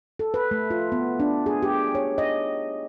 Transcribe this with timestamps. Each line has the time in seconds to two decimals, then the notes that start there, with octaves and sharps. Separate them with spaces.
0.19 A4
0.34 B4
0.51 A3
0.70 F4
0.92 B3
1.20 D4
1.46 G#4
1.63 G4
1.95 C#5
2.18 D#5